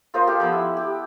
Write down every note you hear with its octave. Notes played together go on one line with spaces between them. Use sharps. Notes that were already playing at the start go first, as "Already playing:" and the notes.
F4 A#4 C5 D#5
G4 A4 F5
F3 B3 E6
E4
G4